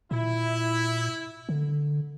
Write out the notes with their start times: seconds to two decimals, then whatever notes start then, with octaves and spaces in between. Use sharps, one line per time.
0.11 A#2 E4
1.49 D3